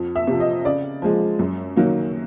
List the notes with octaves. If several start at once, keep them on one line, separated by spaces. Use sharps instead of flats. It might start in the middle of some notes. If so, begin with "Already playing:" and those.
Already playing: F2
E5
C3 F3
D#5
C#3 D5
F3 G#3
F#2
D#3 F#3 A#3